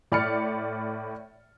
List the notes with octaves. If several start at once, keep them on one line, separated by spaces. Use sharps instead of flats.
A2 D5 B5 F6 A6 C#7